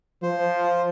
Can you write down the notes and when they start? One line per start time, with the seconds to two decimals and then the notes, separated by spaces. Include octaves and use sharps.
0.23 F3 C5